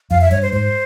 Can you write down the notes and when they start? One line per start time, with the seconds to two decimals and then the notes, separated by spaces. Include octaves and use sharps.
0.11 F2 F5
0.21 E5
0.31 G2 C#5
0.42 C5
0.53 G#2 C5